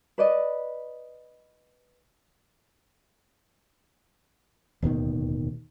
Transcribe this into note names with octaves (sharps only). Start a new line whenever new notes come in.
B4 D5 D#5
D1 D#2 B2 D#3